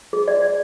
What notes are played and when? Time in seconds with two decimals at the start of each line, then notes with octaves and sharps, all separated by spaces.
0.13 G#4
0.28 D5
0.42 D5